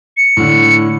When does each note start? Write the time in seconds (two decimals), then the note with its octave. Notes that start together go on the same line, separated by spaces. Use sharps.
0.17 C#7
0.37 A2 D3